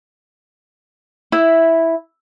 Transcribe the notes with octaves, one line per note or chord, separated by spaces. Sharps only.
E4